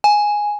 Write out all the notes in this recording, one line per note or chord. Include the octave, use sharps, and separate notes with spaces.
G#5